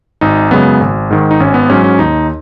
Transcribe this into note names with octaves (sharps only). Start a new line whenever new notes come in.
G#1 D#4
F#2 C#3 G#3 B3
G#1
G#2 D#3
D#4
G#1 C#4
B3
G#2 F#3 C#4
C#4
D#2 D#4